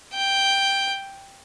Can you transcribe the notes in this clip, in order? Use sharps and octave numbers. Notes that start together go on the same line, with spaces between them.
G5